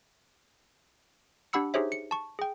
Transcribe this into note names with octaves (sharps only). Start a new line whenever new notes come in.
D4 G4 F#5 B5 E6 C#7
D#4 G4 G#4 C5 C#5 E5
C#7
A5 C#6
G#4 G5